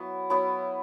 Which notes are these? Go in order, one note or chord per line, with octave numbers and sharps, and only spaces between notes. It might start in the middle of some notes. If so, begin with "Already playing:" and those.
Already playing: F#3 B3 E4
F#3 B3 E4